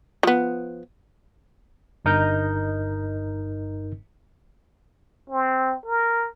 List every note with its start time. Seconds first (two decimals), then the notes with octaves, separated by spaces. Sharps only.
0.23 F3 B3
2.05 G1 G2 D#4 A#4 D#5 G6
5.30 C4
5.86 A#4